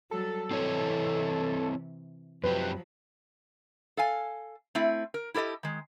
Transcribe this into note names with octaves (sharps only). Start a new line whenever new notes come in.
F#3 G3 A4
C3 E3 C4 E4 C#5
F#2 F3 F#3 C4 G4 B4
A4 F5 G#5
A3 C4 E4
A#4
E4 G4 A4 D5 D#5
D#3 G#3